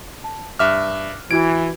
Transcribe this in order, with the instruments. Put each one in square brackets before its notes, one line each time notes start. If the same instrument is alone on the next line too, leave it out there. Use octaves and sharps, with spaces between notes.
[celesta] A5
[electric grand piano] G2 E5 F6 [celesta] D6 F#6
[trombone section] E3 [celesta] E4 F#4 G#6 [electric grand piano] D7